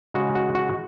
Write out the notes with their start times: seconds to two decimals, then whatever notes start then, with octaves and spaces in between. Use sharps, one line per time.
0.14 C#3 G#3 F#4
0.35 F#4
0.55 F#4